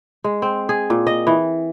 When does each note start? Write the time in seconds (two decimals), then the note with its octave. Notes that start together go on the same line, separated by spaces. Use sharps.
0.24 G#3
0.42 C4
0.69 G#4
0.90 A#2
1.07 D#5
1.27 E3